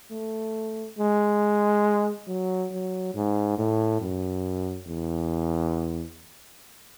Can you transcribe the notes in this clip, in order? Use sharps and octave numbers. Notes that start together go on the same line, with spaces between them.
A3
G#3
F#3
F#3
G#2
A2
F#2
E2